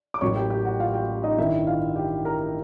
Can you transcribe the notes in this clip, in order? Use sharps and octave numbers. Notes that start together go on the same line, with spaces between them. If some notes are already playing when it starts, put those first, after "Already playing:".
D6
A1 A2 F#3 A#3 C#5 C#6
G4 G5
G4 G5
F#4 F#5
F4 F5
G4 G5
D#4 D#5
A1 G2 D#3 E4 E5
F4 F5
G4 G5
A#4 A#5